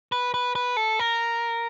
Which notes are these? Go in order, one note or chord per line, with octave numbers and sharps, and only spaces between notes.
B4
B4
B4
A4
A#4